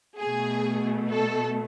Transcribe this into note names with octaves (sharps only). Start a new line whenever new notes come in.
B2 A3 G#4
A4